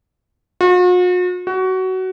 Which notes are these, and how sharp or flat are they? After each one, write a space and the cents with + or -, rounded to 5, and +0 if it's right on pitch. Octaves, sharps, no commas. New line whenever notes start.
F#4 -45
F#4 +20